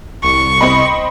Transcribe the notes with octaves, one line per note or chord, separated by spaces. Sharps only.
C2 C#6
C4 D#5 B5